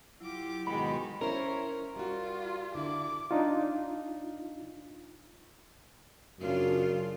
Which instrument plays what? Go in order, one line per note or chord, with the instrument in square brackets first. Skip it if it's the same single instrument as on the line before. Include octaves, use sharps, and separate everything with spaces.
[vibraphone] F#3 E4 [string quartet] F4 G4 D6
[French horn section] G#2 B2 G#3 [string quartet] D#3 F#4 G4 [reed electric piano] B5
[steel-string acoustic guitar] C#4 E4 C5 [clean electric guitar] A#4 [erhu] C#5
[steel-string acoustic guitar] G3 F#4 [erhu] F4
[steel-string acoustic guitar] D3 D4 E4 [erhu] D6
[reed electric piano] D4 D#4 F4
[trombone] F#2 [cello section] C#3 D4 F4